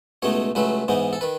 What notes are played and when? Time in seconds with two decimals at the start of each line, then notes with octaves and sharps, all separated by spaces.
0.22 C#2 B2 A3 D#4 C#5
0.55 C#2 C#3 F#3 A3 B4
0.88 G#2 E3 B3 D#4
1.13 A4
1.21 D#3 B4